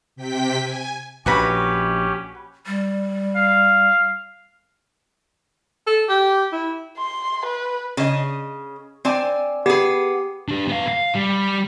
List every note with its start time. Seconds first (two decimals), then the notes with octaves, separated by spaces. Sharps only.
0.16 C3 G5 B6
0.62 G#5
1.26 A#1 A#2 C#4 F#4 G4 B4 B5
2.67 G3
3.36 F5
5.87 A4
6.09 G4
6.52 E4
6.98 C6
7.46 B4
7.97 C#3 D#5
9.05 C4 D5 G#5
9.66 B3 G4 G#4
10.48 D4 G4
10.68 B3 F5
10.88 F5
11.15 G3